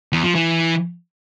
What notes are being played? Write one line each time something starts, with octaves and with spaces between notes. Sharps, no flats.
E2
F3
E3